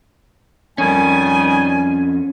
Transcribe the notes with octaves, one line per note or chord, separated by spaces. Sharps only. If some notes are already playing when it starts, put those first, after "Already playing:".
F2 D#3 G3 C#4 G#5